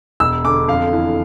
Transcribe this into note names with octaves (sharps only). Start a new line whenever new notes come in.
E1 E6
D3 D6
F2 F5
E3